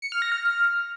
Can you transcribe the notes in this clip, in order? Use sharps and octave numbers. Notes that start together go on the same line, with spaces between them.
C#7
F6
A#6
F6